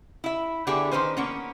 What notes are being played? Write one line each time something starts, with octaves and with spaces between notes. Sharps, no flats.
E4 E5
D3 B3 D4 E4 G4 G#4
D#3 F3 C#4 B4 C5
A#3 B3 C#4